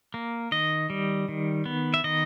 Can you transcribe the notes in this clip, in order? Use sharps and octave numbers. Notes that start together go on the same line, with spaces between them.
A#3
D#3 D#5
G3
D#3
B3
E5
D#3 D#5